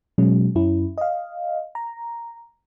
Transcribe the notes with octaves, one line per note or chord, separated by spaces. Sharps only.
B2 F#3 G#3 C#4
F#2 C#4 E4
D#5 F5
A#5